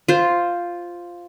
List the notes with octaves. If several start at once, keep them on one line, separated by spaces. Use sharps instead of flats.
F4 C5